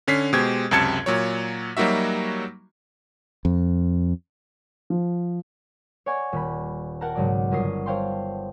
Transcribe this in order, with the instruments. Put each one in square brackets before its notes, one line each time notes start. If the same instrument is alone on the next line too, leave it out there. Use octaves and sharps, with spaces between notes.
[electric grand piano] D3 C#4 B6 C7
B2 G#3 G4 C5 G#6
C#2 F#2 C3 A5 G#6 C#7
A#2 F#3 C#5
F#3 G3 A#3 D#4 F#4 E5
[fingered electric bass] F2
[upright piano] F3
[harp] C#5 D5 F#5 G#5 C#6
D#1 B5
A#4 F#5 G5 A5 A#5 F6
B1 G#2 C#3 F#3 D5 D6
G1 C#4 A#4 D#6 C7
C5 C#5 F5 G5 A5 C6